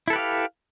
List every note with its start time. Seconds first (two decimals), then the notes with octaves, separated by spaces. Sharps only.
0.08 E4
0.10 A4
0.13 B4
0.16 G4
0.18 F5